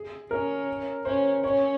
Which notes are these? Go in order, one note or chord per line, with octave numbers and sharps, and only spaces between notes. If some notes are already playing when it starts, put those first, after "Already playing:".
Already playing: G#4
C#4 A#4
C#4 C5
C#4 C#5